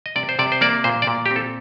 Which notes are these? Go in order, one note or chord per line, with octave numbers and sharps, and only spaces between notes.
D#5
C3 D5
C5
C3 D5
C5
A#3 D5
A#2 C5
D5
A#2
G4
C4
A4